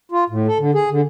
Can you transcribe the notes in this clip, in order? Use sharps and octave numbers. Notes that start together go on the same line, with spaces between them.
F4
A2
A4
D3
G#4
D3